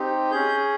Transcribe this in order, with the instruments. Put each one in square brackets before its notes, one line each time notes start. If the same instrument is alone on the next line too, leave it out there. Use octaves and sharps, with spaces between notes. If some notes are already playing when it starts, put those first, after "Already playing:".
Already playing: [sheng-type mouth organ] C4 D#4 G4
C#4 G#4 G6